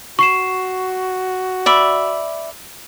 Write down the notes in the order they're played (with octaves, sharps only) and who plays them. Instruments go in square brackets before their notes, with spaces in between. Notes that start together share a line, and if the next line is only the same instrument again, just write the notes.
[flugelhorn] F#4 [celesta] C#6 C7 E7
[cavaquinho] D5 E5 B5